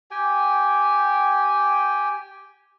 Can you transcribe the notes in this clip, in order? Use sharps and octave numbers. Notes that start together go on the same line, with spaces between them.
G4 G5 G#5